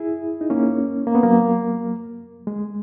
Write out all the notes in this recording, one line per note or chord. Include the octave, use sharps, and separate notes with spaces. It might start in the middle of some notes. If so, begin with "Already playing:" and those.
Already playing: E4 G#4
D#4
A#3 C#4
A#3
B3
F#3 A#3
G#3